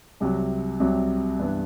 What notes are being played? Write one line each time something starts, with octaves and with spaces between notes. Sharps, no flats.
C2 C3 F#3
C2 C3 F#3
G2 E3 B3 D4